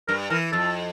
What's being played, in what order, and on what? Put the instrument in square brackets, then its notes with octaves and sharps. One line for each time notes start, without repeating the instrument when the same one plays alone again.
[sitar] G2 [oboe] A#4
[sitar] E3 [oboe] A#4
[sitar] F2 [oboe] A4